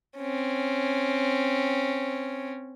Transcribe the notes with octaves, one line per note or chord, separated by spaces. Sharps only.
C4 C#4